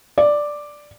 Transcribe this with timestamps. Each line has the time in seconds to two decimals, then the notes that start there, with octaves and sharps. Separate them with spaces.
0.18 D5